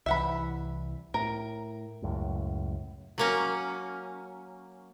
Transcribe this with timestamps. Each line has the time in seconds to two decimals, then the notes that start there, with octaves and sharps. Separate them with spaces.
0.06 C2 E3 E5 F#5 B5
1.14 A2 A#4
2.02 C#2 F#2 A2
3.18 F#3 A#3 C#4